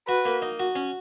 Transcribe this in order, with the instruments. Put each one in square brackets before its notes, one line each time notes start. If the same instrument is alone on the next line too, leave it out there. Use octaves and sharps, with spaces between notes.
[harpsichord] F#4 [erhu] B4
[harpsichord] A#3
D#4
F#4
C#4